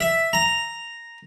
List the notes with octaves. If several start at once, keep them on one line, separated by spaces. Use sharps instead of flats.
E5
A#5